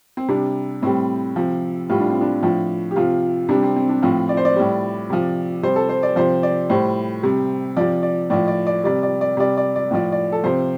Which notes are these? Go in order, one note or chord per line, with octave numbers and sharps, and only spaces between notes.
C4
C3 G3 D4
A2 G3 C4
C3 F3
A2 G3 F4
D4
C4
D4
A2 F3
G4
C3 F3 F4
C3 G3 D4
C4
C4
D4
A2 F3 C4
D5
C5
D5
A2 G3
C3 F3
C3 G3 C5
A4
C5
D5
C3 F3 C5
D5
A2 G3 C5
C3 G3
C3 F3 D5
D5
A2 F3 D5
D5
D5
C3 G3 D5
D5
D5
C3 G3 D5
D5
D5
A2 F3 D5
D5
A4
C3 F3 C5